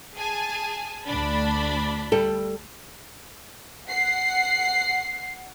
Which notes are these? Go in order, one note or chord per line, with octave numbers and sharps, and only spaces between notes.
G#4 G#5 A5
D2 D4 B5
G3 A4
F#5 C7